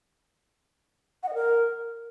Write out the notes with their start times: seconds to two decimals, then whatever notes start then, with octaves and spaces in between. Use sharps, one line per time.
1.23 F#5
1.29 D#5
1.34 A#4